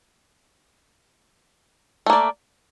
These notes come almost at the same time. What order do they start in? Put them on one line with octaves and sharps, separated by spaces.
A3 A#3 D5